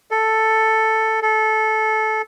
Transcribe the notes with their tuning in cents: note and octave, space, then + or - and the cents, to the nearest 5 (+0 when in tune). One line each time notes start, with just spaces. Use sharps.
A4 +5
A4 -15